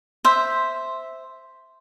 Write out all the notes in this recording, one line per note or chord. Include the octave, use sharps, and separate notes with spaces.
C5 E5